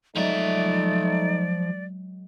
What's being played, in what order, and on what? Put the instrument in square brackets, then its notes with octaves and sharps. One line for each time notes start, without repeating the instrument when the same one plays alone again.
[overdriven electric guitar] F3 E5 [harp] F#3 G#3 [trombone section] A3 D#4 [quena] D5